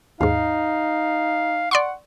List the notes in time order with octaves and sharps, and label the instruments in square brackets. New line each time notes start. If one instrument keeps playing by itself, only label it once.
[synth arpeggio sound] D#2 G#2 [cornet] D#4 [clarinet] F5
[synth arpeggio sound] D5 C6 C#6 [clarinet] F#5